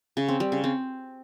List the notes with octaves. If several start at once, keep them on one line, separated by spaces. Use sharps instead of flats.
C#3
C4
G3
C#3
C4